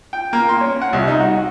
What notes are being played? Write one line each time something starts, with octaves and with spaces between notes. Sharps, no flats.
G5
A#3
C6
C#4
F#5
C2
D#4
F#4